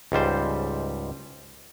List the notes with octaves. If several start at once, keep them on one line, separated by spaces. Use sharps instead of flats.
C#2 G#2 G3 C5